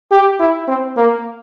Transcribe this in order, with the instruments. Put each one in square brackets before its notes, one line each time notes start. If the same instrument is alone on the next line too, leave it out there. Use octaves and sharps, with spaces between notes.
[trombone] G4
E4
C4
A#3